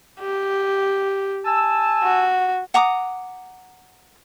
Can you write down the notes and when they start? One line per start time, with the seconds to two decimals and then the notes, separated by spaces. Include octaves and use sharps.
0.20 G4
1.45 G#5 A5 E6
2.03 F#4
2.74 F#5 A#5 D6 D#6